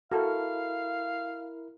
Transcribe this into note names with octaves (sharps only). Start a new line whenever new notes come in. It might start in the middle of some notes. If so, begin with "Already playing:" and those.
E4 F#4 A4 A#4 F5